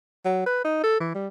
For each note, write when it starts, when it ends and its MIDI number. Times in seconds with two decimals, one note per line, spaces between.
0.25 0.44 54
0.46 0.60 71
0.65 0.81 63
0.84 1.00 69
1.00 1.14 52
1.15 1.28 55